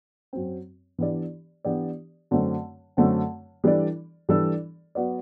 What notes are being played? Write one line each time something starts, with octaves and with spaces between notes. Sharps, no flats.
F#2 F#3 C4
E3 B3 D4 G4 D5
E3 B3 D4 G4 D5
F#2 D3 A3 C4
F#2 D3 A3 C4
E3 G3 D4 A4 D5
E3 G3 D4 A4 D5
F#3 B3 F#4 B4 D5